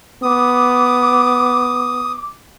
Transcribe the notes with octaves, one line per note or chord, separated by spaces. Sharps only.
B3 D6 D#6